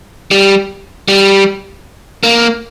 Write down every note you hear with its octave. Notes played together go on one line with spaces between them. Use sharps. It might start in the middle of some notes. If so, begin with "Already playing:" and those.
G3
G3
A#3